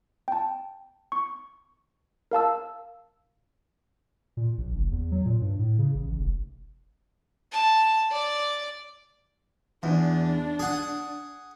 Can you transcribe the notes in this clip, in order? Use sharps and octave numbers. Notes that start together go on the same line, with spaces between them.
G5 A5
C#6
A#4 F5 A5 E6
A#2
A#1
F#1
E2
F#3
A#2
G2
A2
C#3
A1
A1
F1
A5
D5
E2 D4
G#4 F#5